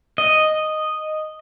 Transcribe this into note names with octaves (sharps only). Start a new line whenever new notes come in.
D#5